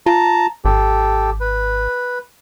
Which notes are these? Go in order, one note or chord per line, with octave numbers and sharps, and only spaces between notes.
F4 A5 A#5
G#1 G4 A4
B4